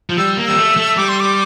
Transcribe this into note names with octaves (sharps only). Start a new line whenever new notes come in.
F3
G3 E6
A#3
G3 E6
A3
A3
G3 D6
C6
D6